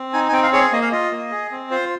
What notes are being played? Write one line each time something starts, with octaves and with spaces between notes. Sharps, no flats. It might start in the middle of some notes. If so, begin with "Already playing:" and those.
Already playing: C4
D#4 G#5
G#5
C4 G5
F5
G#4 C#5
A#3 D#5
F5
F4 D#5
A#3
G#4
C4
F4 C5